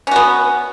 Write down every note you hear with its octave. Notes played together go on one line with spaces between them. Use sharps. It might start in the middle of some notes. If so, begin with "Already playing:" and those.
B3 C#4 F#4